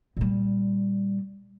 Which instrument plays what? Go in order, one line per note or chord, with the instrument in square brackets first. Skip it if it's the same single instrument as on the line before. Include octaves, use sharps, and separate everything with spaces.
[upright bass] A#2 G3